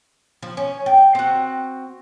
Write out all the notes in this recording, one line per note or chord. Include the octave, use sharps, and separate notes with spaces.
F3
C#4
G5
C4 F#4